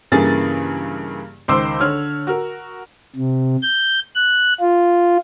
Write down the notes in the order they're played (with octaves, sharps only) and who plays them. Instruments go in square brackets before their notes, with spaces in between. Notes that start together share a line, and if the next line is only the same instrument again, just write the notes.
[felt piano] G2 C#3 E3 A#3 G#4 A6
C#2 D#3 C5 C6 D6 E6
D3 C#5 F6
F#4 A#4
[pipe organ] C3
G6
F#6
F4